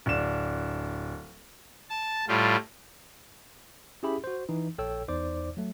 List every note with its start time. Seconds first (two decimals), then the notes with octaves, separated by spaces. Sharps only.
0.06 D1 D4 E7
1.90 A5
2.28 A2 G3 F4
4.03 C#4 E4 G4 G#4 E5 B5
4.24 F#4 C5
4.49 E3 D#4
4.78 A#1 A4 C#5 G5 E6
5.08 E2 D#4 C5 D5 D6
5.57 F#3 A3